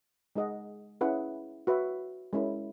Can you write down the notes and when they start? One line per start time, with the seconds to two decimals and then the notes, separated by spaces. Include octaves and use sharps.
0.36 G#3 D#4 G#4 D#5 F#5
1.01 C#4 E4 G#4 B4 F#5
1.67 F#4 B4 E5
2.33 G#3 C#4 E4 A#4